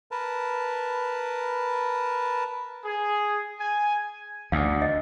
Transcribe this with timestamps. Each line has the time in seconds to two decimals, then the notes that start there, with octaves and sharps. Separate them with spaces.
0.11 A#4 B4 A5
2.85 G#4
3.59 G#5
4.52 D2 F5
4.82 D#5